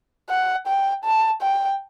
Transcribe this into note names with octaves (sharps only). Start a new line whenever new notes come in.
F#5
G5
A5
G5